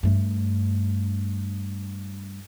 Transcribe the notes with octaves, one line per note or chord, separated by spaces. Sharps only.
G2 A3